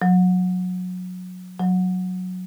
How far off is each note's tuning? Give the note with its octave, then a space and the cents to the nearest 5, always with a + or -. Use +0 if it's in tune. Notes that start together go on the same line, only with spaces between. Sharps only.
F#3 -25
F#3 -10